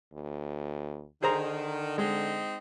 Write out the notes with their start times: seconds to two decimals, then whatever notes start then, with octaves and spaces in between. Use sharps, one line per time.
0.13 D2
1.23 D3 D#3 G#4 C5 A#5
1.98 G#3 C4 D#4